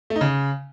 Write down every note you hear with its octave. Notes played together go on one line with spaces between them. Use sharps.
A3
D#4
C#3